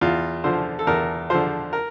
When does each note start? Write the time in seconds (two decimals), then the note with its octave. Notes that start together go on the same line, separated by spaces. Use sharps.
0.01 E2 F4
0.44 D3 F3 C5
0.79 A4
0.87 E2 A#4
1.30 D3 F3 C5
1.73 A#4